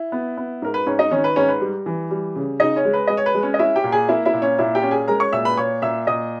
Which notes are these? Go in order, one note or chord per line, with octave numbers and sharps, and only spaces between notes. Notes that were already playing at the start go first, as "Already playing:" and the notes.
Already playing: E4
B3
B3
G#2 A#4
B4
G#2 C#4 C#5
D#4 D#5
D#3 C#4 C#5
B4
G#2 C#4 C#5
B4
G3
E3
G3
C#3
C#3 D#4 D#5
C#4 C#5
G#3
B4
G#3 D#5
C#5
B4
G#3
C#4 C#5
D#5
C#4 E4 E5
G4 G5
A#2
G#4 G#5
A#3 E4 E5
E4 E5
A#2
C#4 C#5
A#2 E4 E5
G4 G5
C#4
G#4 G#5
G#3 A#4 A#5
C#5 C#6
A#2 E5 E6
B4 B5
A#2 C#5 C#6
A#2 E5 E6
A#2 D#5 D#6